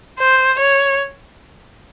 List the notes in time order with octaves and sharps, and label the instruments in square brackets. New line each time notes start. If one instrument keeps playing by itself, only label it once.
[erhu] C5
C#5